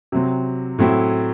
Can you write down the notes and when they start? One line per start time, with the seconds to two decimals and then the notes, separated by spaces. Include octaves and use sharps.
0.12 C3 F#3 C4
0.78 A2 F#3 C4 E4